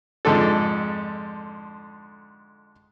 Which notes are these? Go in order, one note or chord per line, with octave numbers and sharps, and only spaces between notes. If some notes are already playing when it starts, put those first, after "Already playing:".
F2 G#2 D3 A4